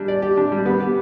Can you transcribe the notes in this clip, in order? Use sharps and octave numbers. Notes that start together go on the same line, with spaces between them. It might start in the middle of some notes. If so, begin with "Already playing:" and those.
Already playing: G3 D4
D5
G4
D4
G3
B3
G4